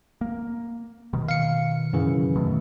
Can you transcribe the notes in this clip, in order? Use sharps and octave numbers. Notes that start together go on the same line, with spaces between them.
A#3
B2 D#3
F5 C#7
F#2 C#3 E3
B2 D#3 A3